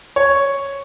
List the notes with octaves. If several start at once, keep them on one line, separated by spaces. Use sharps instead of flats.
C#5